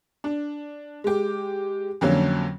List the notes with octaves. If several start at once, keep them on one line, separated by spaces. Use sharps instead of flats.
D4
G#3 G4
F2 D3 F#3 A#3 C#4